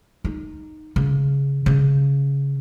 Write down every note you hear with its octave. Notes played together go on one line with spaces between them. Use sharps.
D#4
C#3
C#3